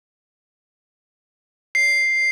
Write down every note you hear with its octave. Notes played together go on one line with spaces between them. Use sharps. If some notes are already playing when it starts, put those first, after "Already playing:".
C7